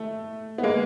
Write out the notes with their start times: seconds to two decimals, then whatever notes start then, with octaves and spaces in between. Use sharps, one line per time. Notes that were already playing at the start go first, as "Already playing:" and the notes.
Already playing: A3
0.58 B3
0.63 G#3 A#3